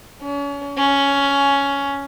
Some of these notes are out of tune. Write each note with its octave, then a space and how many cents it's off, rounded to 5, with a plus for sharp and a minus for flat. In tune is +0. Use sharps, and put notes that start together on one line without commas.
C#4 +35
C#4 +10